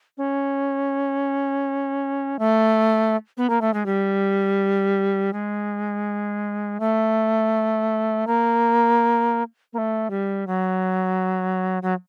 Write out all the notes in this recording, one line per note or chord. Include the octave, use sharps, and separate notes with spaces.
C#4
A3
B3
A#3
A3
G#3
G3
G#3
A3
A#3
A#3
A3
G3
F#3
F#3